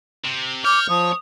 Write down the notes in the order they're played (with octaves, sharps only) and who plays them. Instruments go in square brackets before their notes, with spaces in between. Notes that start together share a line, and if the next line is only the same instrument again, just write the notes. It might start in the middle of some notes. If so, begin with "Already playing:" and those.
[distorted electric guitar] C3
[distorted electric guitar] C#5 [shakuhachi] D6 [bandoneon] F6 G6
[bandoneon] F3 [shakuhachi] D#6